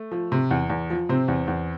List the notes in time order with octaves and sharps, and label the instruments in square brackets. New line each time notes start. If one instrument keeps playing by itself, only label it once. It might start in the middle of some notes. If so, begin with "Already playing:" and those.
Already playing: [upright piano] A3
F3
C3
E2
E2
F3
C3 C4
E2
E2